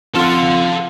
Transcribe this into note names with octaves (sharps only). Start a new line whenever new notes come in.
F2 F4 A4 F#5 C6 F6